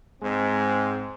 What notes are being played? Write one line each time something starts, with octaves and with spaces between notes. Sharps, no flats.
G#2 G#3 C4